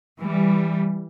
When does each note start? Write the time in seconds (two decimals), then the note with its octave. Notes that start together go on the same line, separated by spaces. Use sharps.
0.21 E3 G3